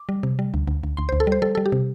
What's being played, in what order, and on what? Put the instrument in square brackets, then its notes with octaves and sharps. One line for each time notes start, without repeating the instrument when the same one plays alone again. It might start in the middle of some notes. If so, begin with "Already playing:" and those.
Already playing: [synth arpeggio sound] D6
G3
C3
G3
D2
D2
D2
D2 C6
D2 C5
A4
G3 C5
G3 A4
G3 A4
G4
C3